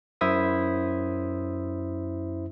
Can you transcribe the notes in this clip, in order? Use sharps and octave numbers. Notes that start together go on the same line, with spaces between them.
F#2 E4 C5 E5 D#6